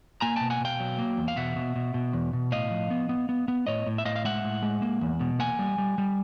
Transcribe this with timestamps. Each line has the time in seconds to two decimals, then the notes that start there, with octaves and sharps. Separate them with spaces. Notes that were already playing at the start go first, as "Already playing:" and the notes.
0.21 A#3 G#5 A#5
0.36 B2 G5 A5
0.50 F#5 G#5
0.60 B2 F5 G5
0.80 F#3
0.99 A#3
1.17 E2
1.28 F5
1.36 B2 E5 F#5
1.56 B2
1.76 B2
1.94 B2
2.13 E2
2.33 B2
2.52 A2 D#5 F5
2.71 F3
2.90 B3
3.09 B3
3.29 B3
3.48 B3
3.67 A2 C#5 D#5
3.86 A2
3.98 E5
4.05 A2 D#5 F5
4.16 F5
4.25 G#3 E5 F#5
4.45 A2
4.63 G#3
4.82 A#3
5.01 E2
5.20 B2
5.39 A#3 F#5 G#5
5.59 G3
5.78 G3
5.98 G3